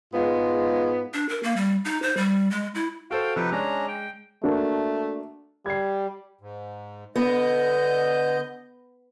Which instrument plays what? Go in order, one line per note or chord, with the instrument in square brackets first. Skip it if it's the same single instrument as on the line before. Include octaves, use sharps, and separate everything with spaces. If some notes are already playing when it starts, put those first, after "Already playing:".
[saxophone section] G#2 G#3 B3 F4
[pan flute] D4
A#4
A#3
G3
D#4
C5
G3
G#3
E4
[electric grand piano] F#4 A4 C5 [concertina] F5 G5
[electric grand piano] C3 F3 [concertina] D#4 A4 B4
[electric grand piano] G#3 [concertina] C#4 D4 A#5
[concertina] G5
[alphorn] A3 [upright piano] A#3 D4 F#4
[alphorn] G3 [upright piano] G#6 C7
[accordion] G#2
[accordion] D3 D#5 G6 [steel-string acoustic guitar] B3